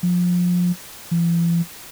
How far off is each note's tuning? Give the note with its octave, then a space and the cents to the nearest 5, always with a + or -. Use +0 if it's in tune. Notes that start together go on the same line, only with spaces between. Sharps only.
F3 +25
E3 +45